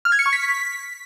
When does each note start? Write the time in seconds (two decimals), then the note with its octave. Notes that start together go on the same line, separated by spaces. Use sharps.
0.05 F6
0.12 G#6
0.19 C#7
0.26 C#6
0.33 B6